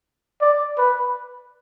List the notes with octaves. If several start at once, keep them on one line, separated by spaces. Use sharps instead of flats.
D5
B4